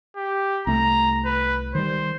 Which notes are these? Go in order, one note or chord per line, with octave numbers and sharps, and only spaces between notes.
G4
C2 A3 A#5
B4
D#3 G3 C5